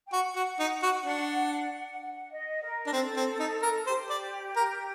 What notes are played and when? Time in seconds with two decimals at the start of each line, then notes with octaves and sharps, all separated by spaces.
0.07 G5
0.12 F#4 F#5
0.36 F#4
0.59 D#4
0.83 F#4
1.06 D4
1.99 F#5
2.31 D#5
2.62 A#4
2.87 D4
2.93 C4 A4
3.17 C4
3.40 D#4
3.63 A#4
3.86 G4 C5
4.10 D5
4.56 A#4